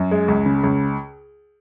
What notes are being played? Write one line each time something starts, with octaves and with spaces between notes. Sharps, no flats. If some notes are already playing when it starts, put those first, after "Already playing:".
Already playing: F#2
G#3
C#2
C#3
C#2